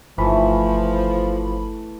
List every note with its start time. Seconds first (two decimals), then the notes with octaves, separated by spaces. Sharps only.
0.18 G1 E3 F3 A3 B5